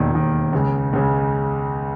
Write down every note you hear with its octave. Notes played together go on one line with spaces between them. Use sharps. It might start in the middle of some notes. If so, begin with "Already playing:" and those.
Already playing: E1 D#2 D#3
E1 D#2 D#3
C#2 C#3 G#3
C#2 C#3 G#3